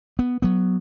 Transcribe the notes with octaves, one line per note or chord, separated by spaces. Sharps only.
B3
F#3 B3